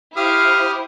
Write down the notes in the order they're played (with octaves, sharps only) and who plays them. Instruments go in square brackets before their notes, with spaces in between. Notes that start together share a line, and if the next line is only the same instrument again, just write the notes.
[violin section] E4 C5 [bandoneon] G4 D#6 F6 [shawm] F5